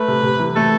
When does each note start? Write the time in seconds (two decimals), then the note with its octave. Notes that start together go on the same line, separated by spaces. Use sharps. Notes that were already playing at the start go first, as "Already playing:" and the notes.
Already playing: A3 B4
0.08 C3
0.23 C3
0.39 E3
0.56 A3 A4